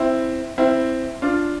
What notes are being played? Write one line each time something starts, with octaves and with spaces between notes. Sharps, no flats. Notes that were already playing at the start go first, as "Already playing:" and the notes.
Already playing: C4 E4
C4 E4
D4 F4